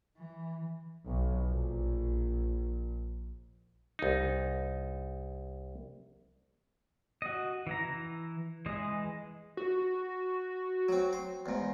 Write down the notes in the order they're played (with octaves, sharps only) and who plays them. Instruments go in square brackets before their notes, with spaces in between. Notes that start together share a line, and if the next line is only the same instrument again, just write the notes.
[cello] E3
[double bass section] B1
A#1
[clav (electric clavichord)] C2 D#4
[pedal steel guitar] F#4 D#5
E3 E4 A#5
E3 G#3 D#5
[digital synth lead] F#4
[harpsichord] F#3 C4
C5
E2 G#2